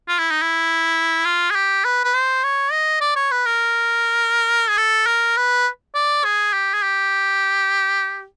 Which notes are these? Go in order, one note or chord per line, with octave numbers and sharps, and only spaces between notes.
F4
E4
D#4
E4
F4
G#4
G4
B4
B4
C5
C#5
D#5
D5
C#5
B4
A#4
G#4
A4
A#4
B4
D5
G#4
G4
G#4
G4